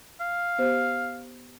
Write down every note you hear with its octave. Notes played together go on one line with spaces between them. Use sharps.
F5
B3 G4 C5